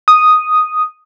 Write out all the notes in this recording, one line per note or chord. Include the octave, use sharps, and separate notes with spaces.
D#6